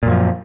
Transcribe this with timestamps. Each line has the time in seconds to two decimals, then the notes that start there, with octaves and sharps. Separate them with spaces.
0.03 A#2
0.06 F#2
0.10 F3